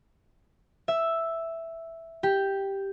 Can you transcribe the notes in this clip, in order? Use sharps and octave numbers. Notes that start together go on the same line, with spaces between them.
E5
G4